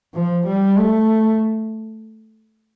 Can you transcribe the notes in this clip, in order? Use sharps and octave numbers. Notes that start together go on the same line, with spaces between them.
F3
G3
A3